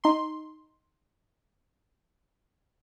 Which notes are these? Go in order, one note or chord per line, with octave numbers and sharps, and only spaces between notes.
D#4 C6